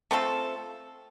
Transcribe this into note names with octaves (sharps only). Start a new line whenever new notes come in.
A3 C4 F4 A4